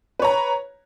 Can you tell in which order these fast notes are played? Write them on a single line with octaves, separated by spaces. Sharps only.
B4 C#5 A#5